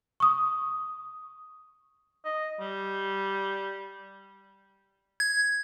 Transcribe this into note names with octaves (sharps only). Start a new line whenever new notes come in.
C#6 D#6
D#5
G3
G#6